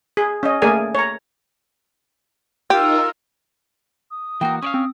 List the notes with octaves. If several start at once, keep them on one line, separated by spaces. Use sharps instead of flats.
G#4
C#4 D#5
A3 A#3 G#4 A#4 D5 G#5
C#5 A#5
D#4 F4 G4 A#4 E6
D#6
E3 A#3 F#4 G5 A#5
C#4 D5 F5 C#6
C4 D#6